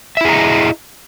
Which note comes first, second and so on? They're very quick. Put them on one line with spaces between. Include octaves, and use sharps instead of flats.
E5 E4 G#4 A#5 D#5